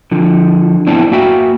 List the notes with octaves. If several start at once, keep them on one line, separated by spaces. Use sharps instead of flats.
D3 F3
A3 B3 C4 D4 E4
A#3 F#4 E5 G5